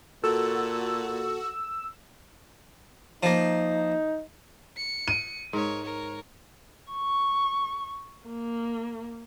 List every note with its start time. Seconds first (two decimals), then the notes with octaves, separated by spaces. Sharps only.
0.24 A#2 F#4 A4 E6
3.23 F3 A#3 D#4
4.77 C#7
5.08 D#7
5.53 G#2 A#4 C#5
5.83 A#4 C#5
6.92 C#6
8.27 A#3